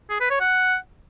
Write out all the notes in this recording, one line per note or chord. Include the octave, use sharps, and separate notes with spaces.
G#4
B4
C#5
F#5